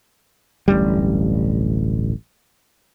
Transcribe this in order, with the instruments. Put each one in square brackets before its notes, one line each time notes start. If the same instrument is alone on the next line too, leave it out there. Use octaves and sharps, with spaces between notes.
[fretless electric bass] D1 A1 G2 G3